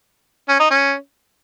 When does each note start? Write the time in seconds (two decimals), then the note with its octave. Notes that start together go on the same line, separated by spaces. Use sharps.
0.48 C#4
0.59 D#4
0.70 C#4